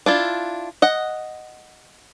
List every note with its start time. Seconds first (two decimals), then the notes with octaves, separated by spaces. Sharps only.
0.06 D4 E4 F4
0.82 D#5 F#5